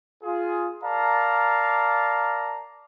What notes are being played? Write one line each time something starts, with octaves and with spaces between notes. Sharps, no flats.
F4 G#4
A#4 D5 F5 A5 A#5